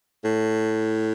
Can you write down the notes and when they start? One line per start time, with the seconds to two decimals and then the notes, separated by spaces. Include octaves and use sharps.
0.24 A2